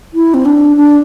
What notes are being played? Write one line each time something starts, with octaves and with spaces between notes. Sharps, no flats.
E4
C4
D4
D4